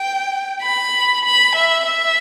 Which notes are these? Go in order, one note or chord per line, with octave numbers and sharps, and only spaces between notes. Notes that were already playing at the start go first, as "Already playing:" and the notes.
Already playing: G5
B5
B5
E5
E5